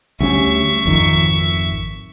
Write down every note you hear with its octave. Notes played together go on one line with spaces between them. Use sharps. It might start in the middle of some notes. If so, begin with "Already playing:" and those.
D2 G3 C#4 E5 C#6
G#1 F2 D#3